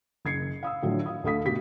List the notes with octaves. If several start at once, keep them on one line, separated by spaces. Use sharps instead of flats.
F#1 G#6 C7 C#7
F5 D#6 E6
A2 D3 F3 F#3
F5 D#6
D2 A3 A4 F5 D#6 B6
G1 B2 A3 F#4 G4 B6